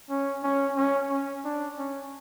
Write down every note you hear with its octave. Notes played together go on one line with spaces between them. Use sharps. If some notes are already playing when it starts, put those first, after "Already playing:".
C#4
C#4
C#4
C#4
D4
C#4